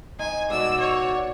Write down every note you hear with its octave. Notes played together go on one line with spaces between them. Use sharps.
C4 D#4 G#5
G#2 B2 A3 F#4 D5 E6
C#5